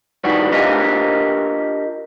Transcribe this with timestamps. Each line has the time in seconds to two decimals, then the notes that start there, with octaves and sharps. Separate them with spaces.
0.24 G2 D#3 E3 G3 D4 F#4
0.52 D4 F4 G4 A#4 D#5 F5